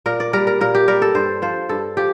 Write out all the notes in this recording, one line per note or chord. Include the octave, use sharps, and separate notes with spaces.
A#2 A#4
D5
G3 A#4
A#4
A#2 A#4
G4
G3 A#4
A4
G2 C5
F3 C5
G2 A4
F3 G4